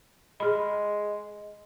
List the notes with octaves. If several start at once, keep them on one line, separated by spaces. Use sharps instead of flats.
G#3 G#4 B5